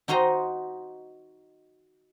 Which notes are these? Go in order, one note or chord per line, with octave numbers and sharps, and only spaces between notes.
D#4 F#4 C5 D#5 A#5